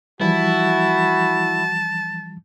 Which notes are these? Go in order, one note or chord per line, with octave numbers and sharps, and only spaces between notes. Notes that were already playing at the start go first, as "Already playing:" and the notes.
E3 F3 G3 E4 F#4 A5